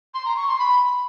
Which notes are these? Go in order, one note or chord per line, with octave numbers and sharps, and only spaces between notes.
C6
A#5
C#6
C6
B5